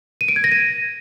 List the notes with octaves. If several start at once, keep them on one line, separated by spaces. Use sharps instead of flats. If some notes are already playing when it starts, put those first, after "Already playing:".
D#7
D7
G#6
A#6
D#7